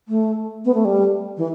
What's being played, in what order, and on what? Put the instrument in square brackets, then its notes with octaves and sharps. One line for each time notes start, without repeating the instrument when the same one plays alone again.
[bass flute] A3
B3
A3
G3
E3